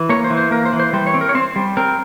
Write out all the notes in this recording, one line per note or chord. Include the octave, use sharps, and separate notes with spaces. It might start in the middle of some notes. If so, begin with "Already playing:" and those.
Already playing: E3
A#3 C#5
C5
E3
C5
A#3 A#4
C5
E3
C5
G3 C5
C#5
C4
A#4
C#5
C4 C5
G3
C4 A#4